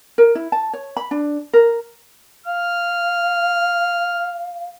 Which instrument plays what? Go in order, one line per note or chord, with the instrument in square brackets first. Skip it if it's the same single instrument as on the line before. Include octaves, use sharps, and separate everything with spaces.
[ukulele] A#4
E4
A5
C#5
B5
D4
A#4
[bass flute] F5 [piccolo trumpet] F6